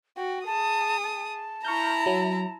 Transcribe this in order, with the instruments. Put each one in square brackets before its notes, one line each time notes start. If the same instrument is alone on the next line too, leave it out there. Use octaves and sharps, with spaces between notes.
[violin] F#4 [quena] G5
[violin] G#4 D#6 [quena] A5
[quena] A5
[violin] E4 A#5 [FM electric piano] C#6 F6 G6
[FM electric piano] F#3